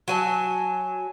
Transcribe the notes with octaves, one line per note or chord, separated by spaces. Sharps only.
F#3 G#5 A5